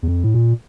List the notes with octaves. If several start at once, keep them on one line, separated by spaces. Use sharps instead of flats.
E2
F2
A2
A#2